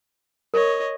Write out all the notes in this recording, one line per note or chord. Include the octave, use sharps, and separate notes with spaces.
A#4 C#5 D#5